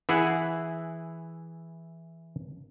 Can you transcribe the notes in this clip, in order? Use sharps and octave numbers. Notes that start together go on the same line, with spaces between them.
E3 E4 G#4 F#5